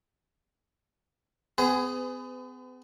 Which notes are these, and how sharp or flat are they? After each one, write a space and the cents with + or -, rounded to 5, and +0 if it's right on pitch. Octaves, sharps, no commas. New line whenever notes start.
B3 +45 G#4 +0 B4 +35